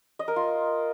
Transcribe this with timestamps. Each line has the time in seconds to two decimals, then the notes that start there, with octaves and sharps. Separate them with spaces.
0.19 D#5
0.28 A#4
0.36 F4